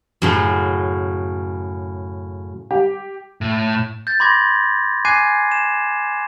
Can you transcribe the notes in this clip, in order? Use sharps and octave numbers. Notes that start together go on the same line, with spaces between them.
F#2 A2 C#3 F#4
G4
A2
G6 A6
B5 C6 D6 G#6 A#6
G#5 D6 F#6 G#6 C7 D#7
E7